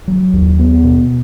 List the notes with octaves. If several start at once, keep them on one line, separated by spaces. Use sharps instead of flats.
F#3
D#2
B3
B2